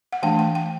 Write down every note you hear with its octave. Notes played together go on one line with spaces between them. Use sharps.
F#5
E3 A3 D4 G5
G5
G5